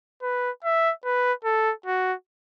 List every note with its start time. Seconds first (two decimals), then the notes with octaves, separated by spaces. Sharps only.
0.22 B4
0.64 E5
1.04 B4
1.44 A4
1.86 F#4